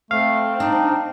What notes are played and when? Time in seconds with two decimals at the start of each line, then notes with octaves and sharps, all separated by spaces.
0.11 A3 C4 F5
0.60 D4 D#4